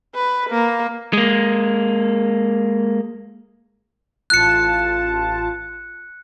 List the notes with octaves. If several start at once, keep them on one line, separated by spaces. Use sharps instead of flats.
B4
A#3
G#3 A#3
A1 F4 A5 F#6 C#7